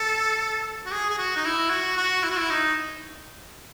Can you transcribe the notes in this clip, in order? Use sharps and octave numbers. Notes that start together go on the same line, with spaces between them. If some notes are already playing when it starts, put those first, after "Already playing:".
Already playing: A4
F#4
G#4
G#4
F#4
D#4
E4
F#4
F#4
E4
F#4
E4
D#4